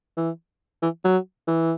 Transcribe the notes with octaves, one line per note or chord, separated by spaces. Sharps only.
E3
E3
F#3
E3